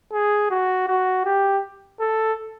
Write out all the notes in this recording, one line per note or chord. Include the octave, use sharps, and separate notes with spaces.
G#4
F#4
F#4
G4
A4